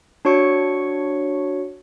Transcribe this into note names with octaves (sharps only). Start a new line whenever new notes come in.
D4 F#4 C#5 C#6 C#7